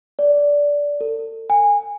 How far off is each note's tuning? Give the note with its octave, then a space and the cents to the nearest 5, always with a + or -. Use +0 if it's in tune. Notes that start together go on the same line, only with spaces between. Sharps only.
D5 -15
A4 +40
G#5 -20